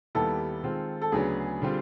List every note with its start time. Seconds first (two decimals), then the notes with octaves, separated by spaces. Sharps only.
0.15 D#2 D#3 G3 B3 E4 A4
0.63 D#3 G#3 C4 F4
1.02 A4
1.12 D2 C#3 F#3 B3 D4 G#4
1.62 D3 G3 C4 F4